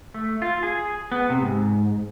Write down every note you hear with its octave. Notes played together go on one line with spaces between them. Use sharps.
A3
F4
G#4
B3
C3
G#2